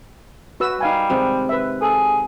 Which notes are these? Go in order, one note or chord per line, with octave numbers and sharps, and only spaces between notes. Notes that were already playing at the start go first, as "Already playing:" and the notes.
F#4 B4 E6
G3 D#4 F5 G#5
C3 D#3 G#3
B4 E5
G#4 A4